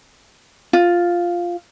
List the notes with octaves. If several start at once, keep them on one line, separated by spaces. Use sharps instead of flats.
F4